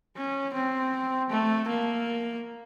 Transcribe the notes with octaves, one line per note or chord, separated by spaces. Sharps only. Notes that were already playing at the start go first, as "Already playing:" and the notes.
C#4
C4
A3
A#3